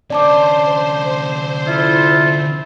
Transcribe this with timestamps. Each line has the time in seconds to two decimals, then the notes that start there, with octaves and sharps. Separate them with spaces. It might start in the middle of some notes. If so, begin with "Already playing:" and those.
0.10 D3 C#4 C5 D5 A5 D6
1.66 E4 F4 A4